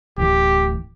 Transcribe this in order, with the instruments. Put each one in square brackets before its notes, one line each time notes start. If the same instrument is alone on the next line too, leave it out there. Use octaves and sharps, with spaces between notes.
[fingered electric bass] D1 A2 E3 [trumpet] G4